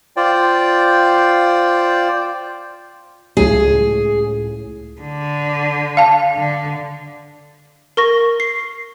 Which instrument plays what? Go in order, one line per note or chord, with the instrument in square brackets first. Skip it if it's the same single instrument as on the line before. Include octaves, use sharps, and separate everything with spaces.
[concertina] F4 C5 D5 G5
[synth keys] C#2 A2 [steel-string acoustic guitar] G#4
[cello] D3
[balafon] F5 A5
[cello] D3
[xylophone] A#4 C#6 A#6
C7